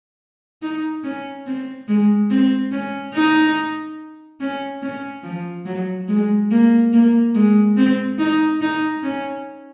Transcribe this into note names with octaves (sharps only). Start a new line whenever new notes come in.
D#4
C#4
C4
G#3
C4
C#4
D#4
C#4
C#4
F3
F#3
G#3
A#3
A#3
G#3
C4
D#4
D#4
C#4